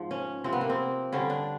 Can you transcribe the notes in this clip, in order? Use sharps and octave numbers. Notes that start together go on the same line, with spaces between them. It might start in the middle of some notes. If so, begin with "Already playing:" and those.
Already playing: G#2 F3
C#4
C3 F3 C4
B3
A#3
C4
G2 D3 G3 C#4
D4